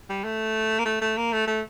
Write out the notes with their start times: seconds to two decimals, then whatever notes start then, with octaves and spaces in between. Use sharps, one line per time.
0.09 G3
0.24 A3
0.79 A#3
0.85 A3
1.01 A3
1.17 A#3
1.32 A3
1.47 A3